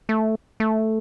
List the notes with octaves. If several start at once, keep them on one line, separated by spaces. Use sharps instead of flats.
A3
A3